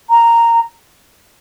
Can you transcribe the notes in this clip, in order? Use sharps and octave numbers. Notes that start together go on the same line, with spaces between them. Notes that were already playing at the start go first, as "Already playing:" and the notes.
A#5